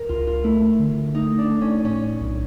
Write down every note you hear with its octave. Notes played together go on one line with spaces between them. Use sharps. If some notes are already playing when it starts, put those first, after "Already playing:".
Already playing: A#4
C#2 F4
F4
A3 E4
D3
A3 D#4
D4
A3
C#4
A2 C#4
B1